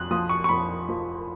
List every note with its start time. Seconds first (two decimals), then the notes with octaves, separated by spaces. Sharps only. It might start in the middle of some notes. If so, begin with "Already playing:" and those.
Already playing: F2 F#6
0.11 F3 D#6
0.29 C#6
0.44 C#6
0.49 F2 B5
0.89 F3